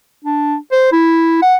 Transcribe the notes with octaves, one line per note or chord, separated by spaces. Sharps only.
D4
C5
E4
F#5